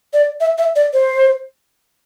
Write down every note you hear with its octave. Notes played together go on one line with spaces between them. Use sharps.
D5
E5
E5
D5
C5